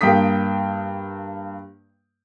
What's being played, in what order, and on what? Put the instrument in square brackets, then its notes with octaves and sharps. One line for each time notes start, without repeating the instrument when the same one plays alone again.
[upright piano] G2 A#3 G5 D#6 B6